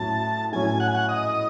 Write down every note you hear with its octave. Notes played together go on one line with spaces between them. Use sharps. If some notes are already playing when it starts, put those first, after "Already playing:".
Already playing: A2 F#3 C#4 A5
A2 F#3 C#4 G#5
F#5
G#5
F#5
D#5